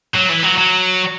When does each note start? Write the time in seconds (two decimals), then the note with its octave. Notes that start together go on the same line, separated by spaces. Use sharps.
0.15 F#3
0.30 E3
0.44 F#3
0.58 F#3